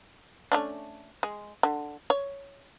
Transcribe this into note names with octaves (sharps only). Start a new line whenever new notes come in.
A3 C#4 D4
G#3
D3
C#5